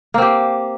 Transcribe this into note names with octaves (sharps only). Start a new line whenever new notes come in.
A#3 C4 G4